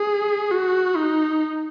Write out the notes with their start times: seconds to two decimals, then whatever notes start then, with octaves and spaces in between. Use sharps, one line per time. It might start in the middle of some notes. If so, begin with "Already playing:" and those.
Already playing: G#4
0.51 F#4
0.96 D#4